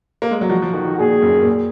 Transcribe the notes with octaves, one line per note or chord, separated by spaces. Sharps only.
A#3
G#3
F#3
F3 F#4
F3
D#3
D#3
A#2 G#4
F#2
A#2